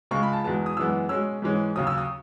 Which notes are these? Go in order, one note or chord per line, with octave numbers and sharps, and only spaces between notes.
C#2 C#3 G#3 C#6
B5
A5
E2 B2 G#3 B3 A5
D#6
F#2 E3 G#3 B3 E6
B2 G#3 C#4 E6
G#2 E3 G#3 C#4
D#2 C#3 F#3 D#6
E6
D#6